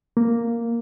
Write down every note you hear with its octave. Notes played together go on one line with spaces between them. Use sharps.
A#3